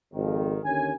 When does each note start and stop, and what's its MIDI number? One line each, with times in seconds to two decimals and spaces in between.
0.13 0.58 32
0.13 0.58 41
0.13 0.58 51
0.63 0.90 39
0.63 0.90 50
0.63 0.90 61
0.63 0.90 80